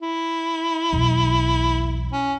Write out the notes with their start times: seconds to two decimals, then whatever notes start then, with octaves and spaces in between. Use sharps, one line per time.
0.02 E4
0.93 B1 E2
2.13 C#4